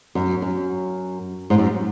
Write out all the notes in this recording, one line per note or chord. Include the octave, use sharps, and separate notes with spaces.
F#2
F#2
G#2
F#2